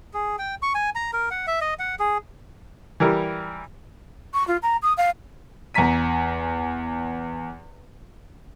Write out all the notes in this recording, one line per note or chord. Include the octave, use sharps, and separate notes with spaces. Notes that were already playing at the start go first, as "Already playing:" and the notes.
G#4
G5
C#6
G#5
A#5
A#4
F#5
E5
D#5
F#5
G#4
E3 G3 A#4
C#6
F4
A#5
D#6
F5
E2 G#5 A#5 B6 D#7